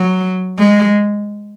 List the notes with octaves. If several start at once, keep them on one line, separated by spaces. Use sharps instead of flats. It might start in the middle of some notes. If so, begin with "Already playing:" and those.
Already playing: F#3
G#3